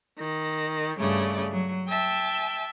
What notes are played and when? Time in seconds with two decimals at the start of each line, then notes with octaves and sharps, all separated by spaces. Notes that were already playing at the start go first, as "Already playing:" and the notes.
0.18 D#3
0.98 G2 C#3 A3 D5
1.51 F#3
1.88 E5 G5 A5